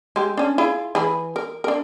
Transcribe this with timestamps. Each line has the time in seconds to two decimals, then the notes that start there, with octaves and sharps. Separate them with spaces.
0.16 G#3 G4
0.37 C#4 D4
0.58 E4 F4 G#4
0.95 E3 G#4 B5
1.36 A#4
1.64 D4 A#4